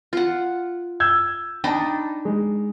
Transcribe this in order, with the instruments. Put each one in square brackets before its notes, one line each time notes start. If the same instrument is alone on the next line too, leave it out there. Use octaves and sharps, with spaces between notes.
[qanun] F4 F#5
[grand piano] E6 G6 G#6
[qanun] D4 D#4 B5 [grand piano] G5 A5
[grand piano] G#3